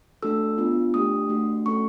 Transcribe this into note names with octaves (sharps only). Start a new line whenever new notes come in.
A3 D4 F#4 A4 E6
B3 D4 F4
A3 D4 G4 D#6
A3 D4 F#4
A3 C#4 F#4 A4 C#6